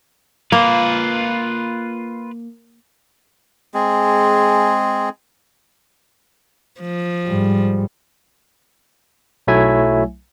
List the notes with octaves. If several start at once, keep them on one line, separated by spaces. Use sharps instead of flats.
A#3 F4 B4
G#3 C4 G#4
F3
G#2 G3
B1 F#3 A3 E4 E5 G#5